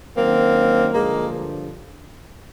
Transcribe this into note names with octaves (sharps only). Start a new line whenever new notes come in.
F#2 D#3 F#3 A#3 C4
G2 D3 F3 G#3 A#3